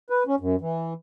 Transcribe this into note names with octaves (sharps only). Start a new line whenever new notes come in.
B4
C#4
F#2
E3